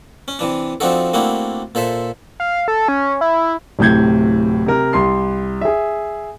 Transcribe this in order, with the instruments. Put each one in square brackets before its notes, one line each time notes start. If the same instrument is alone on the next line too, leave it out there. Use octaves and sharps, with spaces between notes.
[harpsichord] C#4
C3 E3 D4
F3 C4 D4 D#4 F#4 A4
A3 A#3 C4 D4 E4 F#4
A#2 A4 C5 E5
[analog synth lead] F5
A4
C#4
E4
[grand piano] D1 A2 C3 G6 G#6
C3 A#4
C2 C6 C7
G#4 E5